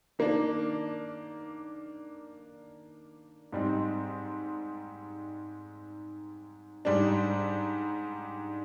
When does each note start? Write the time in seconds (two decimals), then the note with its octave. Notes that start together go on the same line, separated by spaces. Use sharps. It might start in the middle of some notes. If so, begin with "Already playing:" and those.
0.19 D#3 A#3 D4
3.53 G#2 G3 C4 D#4
6.85 G#2 G3 D4